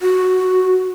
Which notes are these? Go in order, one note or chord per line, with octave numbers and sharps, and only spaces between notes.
F#4